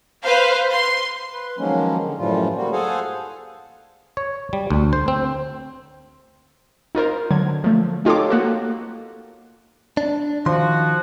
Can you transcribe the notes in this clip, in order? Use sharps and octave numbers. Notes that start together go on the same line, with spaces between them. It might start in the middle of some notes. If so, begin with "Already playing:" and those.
B4 C5 F5
C6
B4
D#3 F3 F#3 G#3 A#3 C#4
D3
F#2 A2 E3 F3 G3 F4
G3 A#3 F#4
G#4 A4 C5 F5 F#5 G#5
C#5
G3
D2
C5
C4
D#4 F4 A#4 C5
D3 F#3 G#6
F3 A3
D#4 F4 G4 A4 C#5 D6
A#3 F#4 A4
D4
D#3 F3 F#4 C6